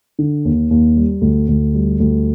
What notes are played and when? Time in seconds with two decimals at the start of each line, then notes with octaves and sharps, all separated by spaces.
0.19 D3
0.45 D#2
0.71 D#2
0.96 G3
1.21 D2
1.48 D2
1.74 G3
2.00 D2